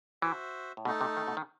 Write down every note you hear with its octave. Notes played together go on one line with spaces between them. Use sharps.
E3 F#4 C5 E5
A2
B2 A3 D#4 A4
C3
D#3
B2
D#3